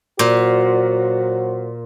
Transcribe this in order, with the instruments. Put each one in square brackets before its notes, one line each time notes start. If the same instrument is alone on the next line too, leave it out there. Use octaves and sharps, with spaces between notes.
[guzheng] A#2 [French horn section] F#3 F#4 C5